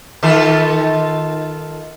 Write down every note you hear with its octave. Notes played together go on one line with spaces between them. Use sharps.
D#3 F4 A4